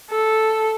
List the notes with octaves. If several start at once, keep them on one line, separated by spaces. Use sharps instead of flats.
A4